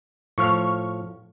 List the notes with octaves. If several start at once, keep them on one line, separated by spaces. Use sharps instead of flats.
A2 F3 C#6 F6